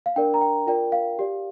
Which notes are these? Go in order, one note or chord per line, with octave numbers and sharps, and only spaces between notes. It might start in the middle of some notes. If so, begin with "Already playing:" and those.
F5
D4 A#4 D5 G5
A#5
G5
F4 A#4 D5 G5
F5
G4 D5